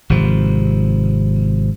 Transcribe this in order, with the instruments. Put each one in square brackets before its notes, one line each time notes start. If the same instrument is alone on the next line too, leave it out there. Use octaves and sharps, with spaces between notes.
[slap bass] G#1 C3 F3